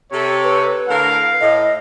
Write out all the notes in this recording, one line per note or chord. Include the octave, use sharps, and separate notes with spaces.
C3 A4 C#5
B4
A2 D3 A#4 F5
A2 D#5